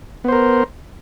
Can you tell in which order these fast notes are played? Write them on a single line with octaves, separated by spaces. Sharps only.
B3 C5 A#4